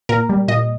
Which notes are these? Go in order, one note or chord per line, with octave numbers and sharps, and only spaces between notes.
A#2 A#4
G3
A#2 D#5